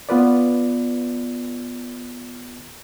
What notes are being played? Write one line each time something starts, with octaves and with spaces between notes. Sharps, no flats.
B3 F4 B4 D5